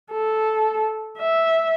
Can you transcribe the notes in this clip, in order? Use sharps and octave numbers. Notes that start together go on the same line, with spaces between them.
A4
E5